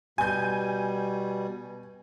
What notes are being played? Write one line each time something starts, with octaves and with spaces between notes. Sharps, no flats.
B2 G3 G#5 G6